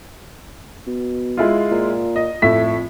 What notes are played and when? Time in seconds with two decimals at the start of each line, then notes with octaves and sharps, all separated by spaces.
0.87 B2
1.37 G#3 E4 F4
1.71 A#2
2.16 D#5
2.42 F2 A2 E5 B6